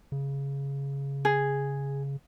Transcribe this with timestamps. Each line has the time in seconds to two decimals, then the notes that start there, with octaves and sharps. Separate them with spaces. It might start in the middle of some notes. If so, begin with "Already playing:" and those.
0.12 C#3
1.25 G#4